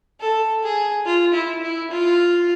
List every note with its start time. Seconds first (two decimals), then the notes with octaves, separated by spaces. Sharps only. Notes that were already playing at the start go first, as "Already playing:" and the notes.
0.20 A4
0.63 G#4
1.05 F4
1.34 E4
1.62 E4
1.90 F4